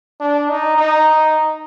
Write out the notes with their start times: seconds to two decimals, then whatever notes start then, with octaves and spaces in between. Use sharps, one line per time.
0.20 D4
0.49 D#4
0.78 D#4